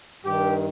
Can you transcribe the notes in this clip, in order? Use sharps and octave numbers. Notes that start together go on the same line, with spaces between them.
G2 D#3 G4